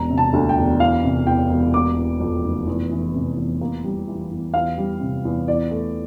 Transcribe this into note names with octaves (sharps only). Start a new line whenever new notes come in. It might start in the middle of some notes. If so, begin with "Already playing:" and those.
Already playing: E1 A#5
C3
A5
D2
G5
E1
E3 F5
C3
E2 G5
E1
A#3 D6
E3
F2
F1
E2
E3
C3
E2
A#3
G3
E3
E2
E2 F5
G3
C3
E2
E2 D5
A3